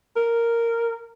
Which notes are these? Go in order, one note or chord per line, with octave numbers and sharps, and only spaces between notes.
A#4